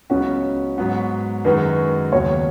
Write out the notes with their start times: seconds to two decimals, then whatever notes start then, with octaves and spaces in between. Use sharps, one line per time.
0.10 C#2 C#3 F#3 B3 C#4 F#4
0.78 G#2 F#3 B3 F#4
1.45 F#2 D#3 G#3 D#4 F#4 B4
2.12 D#2 C#3 F#3 B3 C#5